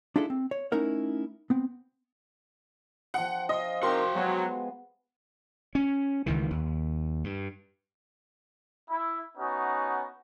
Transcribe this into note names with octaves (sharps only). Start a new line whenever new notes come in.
D4 E4 F4 G#4 A4
C4
C#5
A3 C#4 D#4 E4 A#4 F#5
B3 C4
F3 F#5 G5
F4 D#5
C4 D#4 F#4 A#4 G5 C6
F#3 G#3 B3
C#4
C#2 D#3 E3
D#2
G2
E4
B3 C#4 D#4 F#4